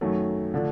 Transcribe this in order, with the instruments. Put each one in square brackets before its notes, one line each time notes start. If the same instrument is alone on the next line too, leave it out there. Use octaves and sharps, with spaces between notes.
[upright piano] F#2 D#3 F#3 A3
D3 F3 A3 D4